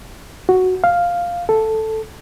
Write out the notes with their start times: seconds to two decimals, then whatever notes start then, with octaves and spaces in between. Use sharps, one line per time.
0.49 F#4
0.84 F5
1.49 A4